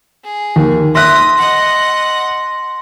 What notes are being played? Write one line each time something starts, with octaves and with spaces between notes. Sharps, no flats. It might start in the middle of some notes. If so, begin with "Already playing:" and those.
G#4
D#2
E5 C6 D#6 F#6 A#6 B6
D#5 F#5